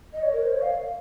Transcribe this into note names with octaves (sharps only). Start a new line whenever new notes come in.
D#5
C#5
A#4
C5
C#5
F5